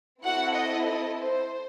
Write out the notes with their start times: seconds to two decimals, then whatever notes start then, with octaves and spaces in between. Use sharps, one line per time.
0.23 C4 E4 F#4 A4 F#5
0.55 D#5
0.86 D#5
1.18 C5